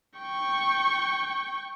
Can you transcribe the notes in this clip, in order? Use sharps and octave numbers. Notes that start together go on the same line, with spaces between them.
G5 C#6